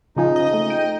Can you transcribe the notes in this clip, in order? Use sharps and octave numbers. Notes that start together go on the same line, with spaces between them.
C#3 F3 D#4 G#4
D#5
A3
G5